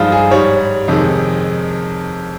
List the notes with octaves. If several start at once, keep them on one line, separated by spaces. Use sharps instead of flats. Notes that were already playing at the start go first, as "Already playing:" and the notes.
Already playing: G2 F3 G#3 D#4 F4
G#4
G#2 G3 C#5
F2 C3 D#3 G#3